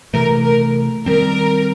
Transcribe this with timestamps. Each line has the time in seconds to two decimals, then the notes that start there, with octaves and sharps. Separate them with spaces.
0.14 C3 E3 A3 A#4
0.45 A#4
1.06 D#3 G3 C4 A#4